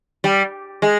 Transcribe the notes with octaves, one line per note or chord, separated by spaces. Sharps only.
G3
G#3